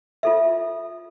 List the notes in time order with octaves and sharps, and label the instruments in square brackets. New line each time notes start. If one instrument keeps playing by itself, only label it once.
[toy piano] F4 A4 E5